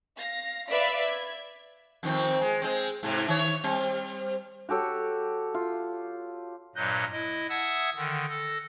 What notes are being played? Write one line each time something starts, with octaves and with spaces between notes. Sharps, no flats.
F5 A#6
B4 D5 E5 F5
G#6
F2 D#3 C4
G#3
G#3 C4
G#2 C3
D#3 C#5
G3 C4
F#4 G4 A4 C#5
F4
G2 A#2 F#3 D#5 F#6 G6
E4 D#5
E5 F#5 A5 D#6 E6 G#6
D3 D#3
A4 A#6